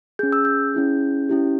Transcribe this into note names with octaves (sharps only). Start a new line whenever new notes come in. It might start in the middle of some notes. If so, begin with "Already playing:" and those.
C#4 G#4 G6
E6
G6
C#4 E4 G#4
C#4 E4 G4